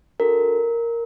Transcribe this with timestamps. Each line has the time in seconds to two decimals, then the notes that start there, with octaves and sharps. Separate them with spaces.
0.20 D4 F#4 A4 A#4